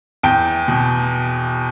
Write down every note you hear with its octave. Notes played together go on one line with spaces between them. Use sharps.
E2 G5
B2